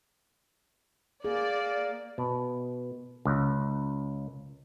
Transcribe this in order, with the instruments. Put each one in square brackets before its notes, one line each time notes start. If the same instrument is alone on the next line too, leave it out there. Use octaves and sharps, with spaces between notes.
[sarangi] A#3 [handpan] G#4 [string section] D5
[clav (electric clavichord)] B2
C#2